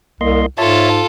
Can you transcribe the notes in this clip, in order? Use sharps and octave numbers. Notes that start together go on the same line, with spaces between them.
C2 A#3 D#5 C6
G#2 F4 A4 C#5 E5 A5